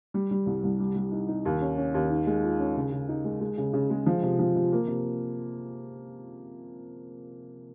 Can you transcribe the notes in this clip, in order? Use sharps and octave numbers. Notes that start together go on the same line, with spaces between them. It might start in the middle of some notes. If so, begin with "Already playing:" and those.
G3
G3
C2
C2
G3
G3
D#4
D#4
D#2
C#4
C#4
D#2
D#3
G#3
F4
C#4
C#3
C#3
D#4
G#3
G#3
C#3
C#3
G#3
F3
C3
F3
C3
A#3
C3